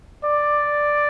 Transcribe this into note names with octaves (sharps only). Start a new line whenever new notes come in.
D5